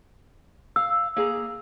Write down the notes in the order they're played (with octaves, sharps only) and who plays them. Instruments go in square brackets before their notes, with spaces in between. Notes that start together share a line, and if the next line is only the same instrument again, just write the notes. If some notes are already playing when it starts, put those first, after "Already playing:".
[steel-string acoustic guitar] F5 [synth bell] E6
[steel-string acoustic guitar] A#3 G#4 A#5